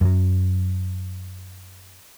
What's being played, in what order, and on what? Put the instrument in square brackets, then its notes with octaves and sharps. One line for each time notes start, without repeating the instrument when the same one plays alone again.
[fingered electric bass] F#2 F#3